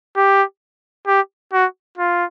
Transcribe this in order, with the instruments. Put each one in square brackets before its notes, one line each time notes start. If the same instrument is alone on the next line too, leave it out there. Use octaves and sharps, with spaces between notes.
[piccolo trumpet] G4
G4
F#4
F4